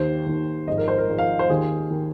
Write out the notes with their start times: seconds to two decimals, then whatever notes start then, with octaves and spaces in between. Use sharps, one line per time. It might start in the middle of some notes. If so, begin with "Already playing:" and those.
Already playing: D#2 D#3 C5
0.26 D#2 D#3
0.67 G#1 G#2 F3 D#5
0.78 A#4
0.88 C5
0.98 A#4
1.09 G#1 G#2 F3
1.18 F5
1.39 C5
1.49 D#2 D#3 G#4
1.90 D#3